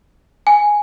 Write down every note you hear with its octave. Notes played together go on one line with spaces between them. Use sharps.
G#5